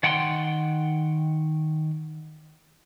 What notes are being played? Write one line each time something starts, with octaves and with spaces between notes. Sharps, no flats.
D#3 F#5 G5 B5 C6